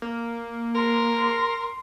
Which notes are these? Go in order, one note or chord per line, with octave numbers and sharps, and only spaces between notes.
A#3
A#4 C6